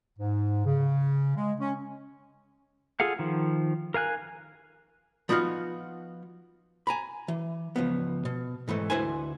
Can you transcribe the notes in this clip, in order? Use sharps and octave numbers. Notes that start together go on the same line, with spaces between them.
G#2
C#3
G#3
C#4
F4 G#4 A4 F5 F#5
D#3 F3
A#4 F5 G#5 F#6
F3 B3 D#4 F#4 F5
G#5 A#5 B5
E3
C#2 F3 B3
B2
G#2 E3 G#3 A3
D2 E3 E4 B4 C5 G#5